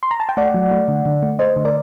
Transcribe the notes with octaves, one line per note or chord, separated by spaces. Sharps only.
C6
A#5
A5
G5
A3 D5 F#5
F#3
A3
D3
D3
A3
A3 C5 D#5
D3
A#4 D5